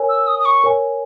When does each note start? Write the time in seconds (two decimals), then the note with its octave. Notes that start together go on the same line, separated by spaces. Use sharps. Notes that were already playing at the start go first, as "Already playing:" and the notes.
Already playing: A#4 C#5 G#5
0.09 E6
0.27 D#6
0.40 D#6
0.45 C#6
0.64 A#4 C#5 G#5